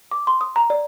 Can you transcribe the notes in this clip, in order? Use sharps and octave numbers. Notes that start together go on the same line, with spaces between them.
D6
C6
D#6
A#5
D5